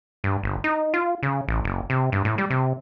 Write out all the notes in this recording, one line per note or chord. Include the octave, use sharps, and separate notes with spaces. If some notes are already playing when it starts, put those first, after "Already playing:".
G2
G1
D#4
F4
C#3
A1
F#1
C3
G2
A2
G3
C3